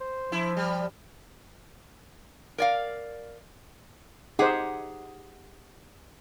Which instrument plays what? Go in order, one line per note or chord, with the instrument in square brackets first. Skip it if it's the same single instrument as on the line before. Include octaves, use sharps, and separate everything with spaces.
[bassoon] C5
[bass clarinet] F3 [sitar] E4
[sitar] G3
[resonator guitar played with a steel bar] A#4 D5 F5
[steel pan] D#4 C5 [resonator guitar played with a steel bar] G4 G#4 F#5